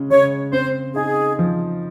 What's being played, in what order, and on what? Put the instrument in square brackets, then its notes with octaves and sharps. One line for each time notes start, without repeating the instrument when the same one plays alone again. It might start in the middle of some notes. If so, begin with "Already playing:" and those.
Already playing: [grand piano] C#3 G#3 C#4
[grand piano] C#3 [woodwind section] C#5
[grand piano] C4 [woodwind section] C5
[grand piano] D#4 [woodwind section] G#4
[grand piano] F3